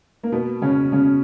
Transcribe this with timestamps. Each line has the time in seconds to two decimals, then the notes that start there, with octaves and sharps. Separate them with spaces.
0.23 A#3
0.32 B2 B3
0.62 C#3 C#4
0.92 C#3 C#4